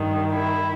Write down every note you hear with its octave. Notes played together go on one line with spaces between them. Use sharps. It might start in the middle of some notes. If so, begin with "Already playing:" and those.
Already playing: G2 D#3
E4